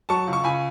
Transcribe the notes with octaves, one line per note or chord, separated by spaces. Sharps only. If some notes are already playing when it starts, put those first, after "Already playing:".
F#3 A5 C#6
C#2
C#6
C#2 G#5 B5